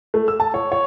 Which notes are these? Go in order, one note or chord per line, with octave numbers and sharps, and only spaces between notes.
A3
E6
A5
C#5
C#5